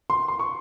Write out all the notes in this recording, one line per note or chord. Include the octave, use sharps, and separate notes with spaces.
C6
C6
C#6